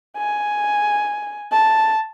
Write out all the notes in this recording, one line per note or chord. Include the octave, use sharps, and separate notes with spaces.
G#5
A5